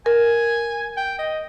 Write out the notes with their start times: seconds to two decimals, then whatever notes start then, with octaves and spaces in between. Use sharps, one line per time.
0.06 A#4 G#5
0.97 G5
1.19 D#5